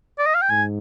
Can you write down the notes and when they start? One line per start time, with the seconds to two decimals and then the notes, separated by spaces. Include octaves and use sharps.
0.19 D5
0.26 D#5
0.35 F5
0.42 G5
0.50 G#2 G#5